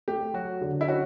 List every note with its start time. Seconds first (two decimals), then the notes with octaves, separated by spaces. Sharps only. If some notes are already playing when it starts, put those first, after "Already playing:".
0.08 A3 G4
0.34 F#3 F#4
0.62 D3
0.81 E4
0.88 C#4 F#4